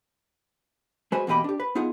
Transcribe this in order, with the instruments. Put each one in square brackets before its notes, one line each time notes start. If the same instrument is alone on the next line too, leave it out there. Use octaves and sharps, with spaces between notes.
[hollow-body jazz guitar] G#3 F#4 G#4 B4 C5
E2 B2 A#3 G4 D#5 B5
D4 G4
B4
B3 D#4 F4 G#4 F#5